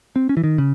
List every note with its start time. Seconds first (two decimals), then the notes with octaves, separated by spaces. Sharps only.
0.16 C4
0.29 C#4
0.37 E3
0.44 D#3
0.58 C#3